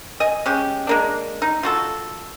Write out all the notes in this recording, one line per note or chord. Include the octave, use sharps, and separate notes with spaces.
D#5 G#5
G#3 C#4 G4
G#3 A#3 D4
D#4
F4 F#4 A4